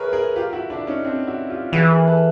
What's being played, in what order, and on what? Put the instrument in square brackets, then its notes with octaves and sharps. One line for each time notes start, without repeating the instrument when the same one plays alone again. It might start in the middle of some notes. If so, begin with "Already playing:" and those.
Already playing: [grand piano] G#4 A#4 B4 C#5 E5
G#4 A#4
F4 G4
E4 F#4
D4 E4
C#4 D#4
C4 D4
E4 F#4
F4 G4
[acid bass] E3 [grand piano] F#4 G#4
[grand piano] G#4 A#4
A4 B4